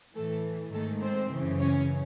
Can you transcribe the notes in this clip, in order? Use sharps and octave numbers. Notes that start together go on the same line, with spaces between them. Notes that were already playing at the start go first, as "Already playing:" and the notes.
A2 E3 A3 A4
G#2 D#3 A3 A4
C4 C5
F#2 C#3 E3
C#4 C#5